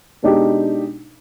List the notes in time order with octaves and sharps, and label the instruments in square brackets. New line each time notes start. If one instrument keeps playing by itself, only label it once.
[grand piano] B2 G#3 D4 D#4 G4